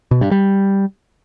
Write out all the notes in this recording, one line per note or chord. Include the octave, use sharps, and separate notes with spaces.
B2
G2
G3